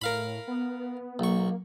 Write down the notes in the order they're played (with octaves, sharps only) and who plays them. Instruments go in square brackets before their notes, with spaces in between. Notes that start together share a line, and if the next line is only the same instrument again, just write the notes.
[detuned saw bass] A2 [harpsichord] A#4 F5 B5
[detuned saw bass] B3
[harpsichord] B1 C#6 [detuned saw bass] A#3